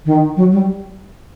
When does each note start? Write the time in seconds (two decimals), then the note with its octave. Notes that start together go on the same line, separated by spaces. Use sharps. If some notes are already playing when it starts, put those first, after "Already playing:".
0.06 D#3
0.37 F#3
0.52 G3